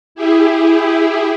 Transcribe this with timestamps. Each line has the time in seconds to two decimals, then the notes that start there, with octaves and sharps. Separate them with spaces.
0.15 E4 G4 G#4